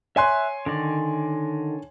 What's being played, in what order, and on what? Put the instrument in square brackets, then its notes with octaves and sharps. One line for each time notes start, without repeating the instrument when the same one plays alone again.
[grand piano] C#5 G#5 C6 [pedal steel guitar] E5 F#6
[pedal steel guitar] D3 D#3 D5